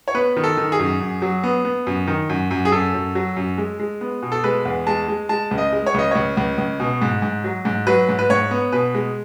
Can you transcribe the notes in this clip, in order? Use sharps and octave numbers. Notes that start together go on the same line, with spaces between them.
C#5
B3 B4
D#3
A4
D#3
G#4
F#2
F#2
F#3
B3
B3
F#2
D#3
F#2
F#2
G#4
F#2 A4
F#2
F#3
F#2
G#3
G#3
B3
B2
A4
G#3 B4
E2
G#3 A5
G#3
G#3 A5
C#2
D#5
G#3
C#5
C#2 D#5
C#2 C#5
C#2
C#2
B2
G#2
G#2
F#3
G#2
F#3 B4
G#2
B4
G#2 C#5
B3
B2 B4
G#3